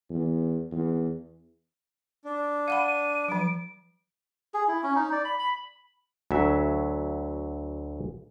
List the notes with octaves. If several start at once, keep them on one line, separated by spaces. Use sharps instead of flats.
E2
E2
D4
F5 F#5 B5 D#7
F3 F#3 D7
G#4
E4
C#4
D#4
D5
B5
B5
D2 F#3 E5